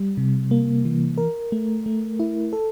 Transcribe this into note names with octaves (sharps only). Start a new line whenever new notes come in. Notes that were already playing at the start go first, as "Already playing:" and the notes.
Already playing: G3
C3
A#3
E3
A#4
A3
A3
E4
A4